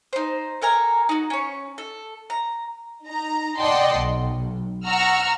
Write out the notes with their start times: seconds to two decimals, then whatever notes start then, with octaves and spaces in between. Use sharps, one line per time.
0.13 D#4 C5
0.62 A4 A#4 G#5 A#5
1.09 D#4 F#4
1.30 C#4 C#5
1.78 A4
2.30 A#5
3.05 D#4 A#5
3.57 D5 D#5 F#5 G5 A5 C6
3.96 B1
4.86 F#5 A#5 C#6 E6 F6